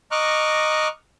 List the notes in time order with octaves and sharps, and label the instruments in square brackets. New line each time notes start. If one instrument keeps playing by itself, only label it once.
[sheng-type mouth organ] D#5 A#5 C#6 D6 F6 F#6